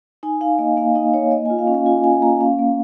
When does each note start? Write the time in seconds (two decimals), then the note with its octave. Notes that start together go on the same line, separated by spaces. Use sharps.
0.23 D#4 G#5
0.41 D#4 F5
0.59 A#3 D#5
0.77 A#3 F5
0.95 D#4 D#5
1.14 D#4 C#5
1.31 A#3 D#5
1.45 G#5
1.50 F4
1.59 F5
1.67 C#4
1.74 F5
1.86 F4 G#5
2.04 C#4 G#5
2.22 A#3 A#5
2.41 C#4 F5
2.59 A#3